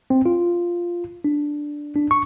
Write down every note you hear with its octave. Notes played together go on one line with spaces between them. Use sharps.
C4
F4
D4
D4
C#6